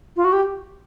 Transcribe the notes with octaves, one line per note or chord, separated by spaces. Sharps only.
F4
F#4
G4